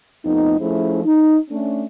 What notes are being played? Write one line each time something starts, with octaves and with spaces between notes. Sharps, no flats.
F2 A3 B3 D#4
F3 A3 C#4 E4 G#4 C5
D#4
A3 C#4 D4